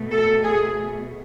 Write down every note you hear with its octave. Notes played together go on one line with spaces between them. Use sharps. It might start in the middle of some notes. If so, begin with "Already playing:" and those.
Already playing: B2 A3
A4
G#4